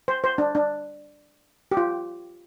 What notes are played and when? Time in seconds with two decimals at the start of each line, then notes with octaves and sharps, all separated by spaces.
0.08 C5
0.24 C5
0.38 D4
0.55 D4
1.71 G4
1.77 F4